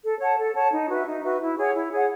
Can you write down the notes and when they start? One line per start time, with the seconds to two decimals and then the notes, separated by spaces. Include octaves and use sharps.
0.03 A4
0.20 C#5 F#5 A5
0.38 A4
0.55 C#5 F#5 A5
0.72 D#4
0.89 F#4 B4 E5
1.06 D#4
1.23 F#4 B4 E5
1.40 E4
1.58 G#4 C#5 F#5
1.75 E4
1.92 G#4 C#5 F#5